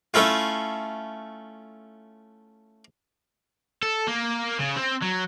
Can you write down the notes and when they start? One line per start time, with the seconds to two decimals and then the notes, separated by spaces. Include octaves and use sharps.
0.14 A3 C#4 E4 F4
3.83 A4
4.07 A#3
4.59 C#3
4.76 C4
5.02 F#3